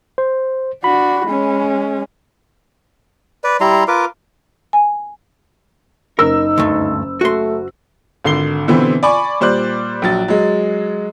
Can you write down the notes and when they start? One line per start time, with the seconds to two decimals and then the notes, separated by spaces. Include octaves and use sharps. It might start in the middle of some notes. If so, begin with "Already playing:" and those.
0.18 C5
0.84 D4 F#4 B5
1.28 G#3 C#4
3.44 B4 D5
3.60 G3 E4 A#5 C6
3.88 F4 A#4 B4 D6
4.73 G#5
6.19 F#1 D#4 A#4 E6
6.58 D2 G2 A3
7.21 A3 F#4 C6
8.24 G#1 D3 C7 G7
8.68 B2 D3 E3 B3 C4
9.03 D5 G#5 B5 C#6 D6
9.40 A#2 G3 C5 D5 F#6
10.02 A#1 F#3 A6
10.28 F#3 G#3